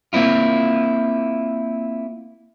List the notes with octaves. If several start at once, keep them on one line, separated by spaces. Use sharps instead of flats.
A#3 C4 E4 F4